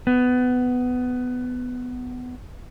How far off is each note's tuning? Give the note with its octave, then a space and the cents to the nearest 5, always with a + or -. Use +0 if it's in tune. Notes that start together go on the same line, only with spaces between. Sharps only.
B3 +15